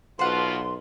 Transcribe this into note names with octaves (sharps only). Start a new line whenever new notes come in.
B1 B2 F4 C5 F#5 C6